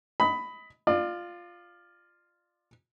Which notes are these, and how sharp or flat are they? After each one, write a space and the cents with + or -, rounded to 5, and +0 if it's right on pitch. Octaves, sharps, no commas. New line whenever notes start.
D#5 +25 B5 +10
F4 +0 D5 +35